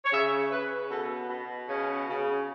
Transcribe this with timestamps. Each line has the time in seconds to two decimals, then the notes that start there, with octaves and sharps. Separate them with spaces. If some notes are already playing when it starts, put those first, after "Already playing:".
0.05 C#5
0.12 C#3 E5
0.51 C#3 B4
0.91 B2 A4
1.30 B2
1.69 C#3 C#4
2.09 C#3